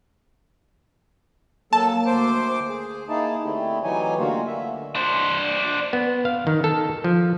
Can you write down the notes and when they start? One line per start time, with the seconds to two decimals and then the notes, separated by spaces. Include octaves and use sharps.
1.73 F#3 A#3 A4 A5
2.06 D2 C5 D6
2.68 G#4
3.09 A#3 D#4 E4 G#4 A5
3.44 D3 A3 C4 E4 G4
3.84 E3 F#3 D#4 G4 C#5 G#5
4.19 D3 A3 A#3 F4 F#4
4.47 D3 A#3 E5
4.95 D4 C5
5.93 B3
6.25 F5
6.47 D#3
6.64 A4
7.04 F3